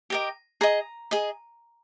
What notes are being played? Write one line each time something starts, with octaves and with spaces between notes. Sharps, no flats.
G4 A#4 D#5
G#4 D#5 A#5
G#4 D#5